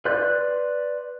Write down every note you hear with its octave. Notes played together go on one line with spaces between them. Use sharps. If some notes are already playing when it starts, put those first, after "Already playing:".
B4 D5 C6 F#6 G6